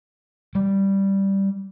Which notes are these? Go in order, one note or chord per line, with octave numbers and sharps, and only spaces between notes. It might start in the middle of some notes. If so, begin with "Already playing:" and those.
G3